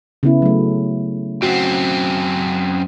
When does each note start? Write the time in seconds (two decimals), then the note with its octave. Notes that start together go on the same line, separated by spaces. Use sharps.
0.23 C#3 B3 E4
0.42 F#3 A3
1.43 F#2 C4 F#4